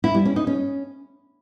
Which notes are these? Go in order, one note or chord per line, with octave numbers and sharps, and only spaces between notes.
E4
G3
C#4
D#4
C#4